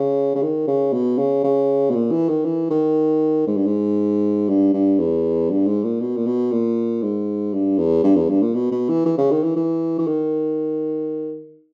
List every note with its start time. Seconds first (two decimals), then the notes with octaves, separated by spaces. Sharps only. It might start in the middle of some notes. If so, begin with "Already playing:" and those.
Already playing: C#3
0.35 C#3
0.42 D#3
0.68 C#3
0.93 B2
1.18 C#3
1.44 C#3
1.91 B2
1.95 A#2
2.11 E3
2.29 D#3
2.45 E3
2.70 D#3
3.47 G#2
3.57 G2
3.66 G#2
4.49 G2
4.73 G2
4.99 E2
5.50 G2
5.67 G#2
5.84 A#2
6.01 B2
6.17 A#2
6.27 B2
6.52 A#2
7.02 G#2
7.53 G2
7.79 E2
8.04 G2
8.16 E2
8.29 G2
8.42 A#2
8.55 B2
8.72 B2
8.89 E3
9.06 E3
9.18 C#3
9.31 D#3
9.43 E3
9.56 E3
9.99 E3
10.07 D#3